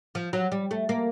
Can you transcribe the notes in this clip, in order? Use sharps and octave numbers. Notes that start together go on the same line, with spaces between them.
F3
F#3
G3
A3
A#3